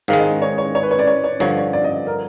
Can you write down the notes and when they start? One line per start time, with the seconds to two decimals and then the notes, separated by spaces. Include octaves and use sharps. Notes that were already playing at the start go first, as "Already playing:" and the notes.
0.08 G#2 D#3 G#3 F5
0.19 D#5
0.42 C#5
0.58 C#5
0.75 C#5
0.83 B4
0.91 C#5
0.99 D5
1.07 C#5
1.24 C#5
1.40 G2 D3 F3 C#5
1.57 D5
1.73 D5
1.84 D#5
2.07 A#4